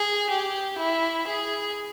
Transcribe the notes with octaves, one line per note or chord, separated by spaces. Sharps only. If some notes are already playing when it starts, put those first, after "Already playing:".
Already playing: G#4
G4
E4
G#4